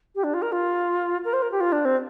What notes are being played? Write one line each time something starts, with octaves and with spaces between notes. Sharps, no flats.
G4
D4
F4
A#4
F4
A#4
C5
A#4
G4
F4
D4
C4